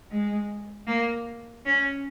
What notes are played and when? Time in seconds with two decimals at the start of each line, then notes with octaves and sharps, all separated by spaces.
0.11 G#3
0.87 A#3
1.65 C#4